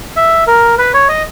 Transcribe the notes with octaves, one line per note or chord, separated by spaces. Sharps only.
E5
A#4
B4
C#5
D#5